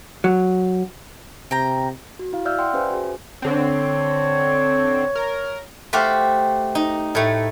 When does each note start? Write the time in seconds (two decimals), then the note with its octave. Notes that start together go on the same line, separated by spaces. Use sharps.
0.24 F#3
1.51 C3 G5 A#5
2.19 F#4
2.33 E4 F5
2.45 D5 E5 F5 E6 F6 G6
2.58 D5 E5 F#5 G5 C6
2.73 C#4 G4 B4 C5 E5 G#5
2.90 F#4 G#4
3.42 D3 C4 C#5
5.15 A#4
5.93 A3 F#4 G4 C5 F5
6.75 D#4
7.15 A2 A3